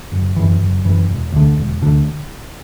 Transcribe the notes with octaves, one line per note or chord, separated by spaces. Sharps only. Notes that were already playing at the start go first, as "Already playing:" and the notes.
F#1
F#2 E3
F#1
F#2 E3
E1
D2 D3
E1
D2 D3